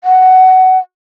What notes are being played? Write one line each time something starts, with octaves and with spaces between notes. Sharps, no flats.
F#5